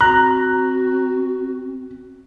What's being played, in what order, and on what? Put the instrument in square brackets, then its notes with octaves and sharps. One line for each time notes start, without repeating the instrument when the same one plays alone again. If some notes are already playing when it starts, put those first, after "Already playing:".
[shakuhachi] C4 [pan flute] F#4 [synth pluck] A#5 [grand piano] F#6